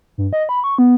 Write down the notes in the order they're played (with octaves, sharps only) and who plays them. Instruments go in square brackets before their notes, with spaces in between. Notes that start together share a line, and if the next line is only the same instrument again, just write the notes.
[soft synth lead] G2
D#5
B5
C#6
B3